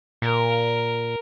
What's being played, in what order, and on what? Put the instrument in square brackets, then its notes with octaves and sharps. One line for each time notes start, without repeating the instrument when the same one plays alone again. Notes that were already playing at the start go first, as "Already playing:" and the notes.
[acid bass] A#2 [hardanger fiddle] A#4